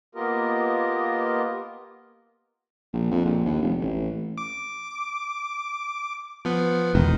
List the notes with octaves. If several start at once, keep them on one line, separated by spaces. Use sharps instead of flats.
A#3 B3 F4 G4 A#4 D#5
A#1
F2
A#1
D#2
F1
A1
D6
F3 B3
E1 D#3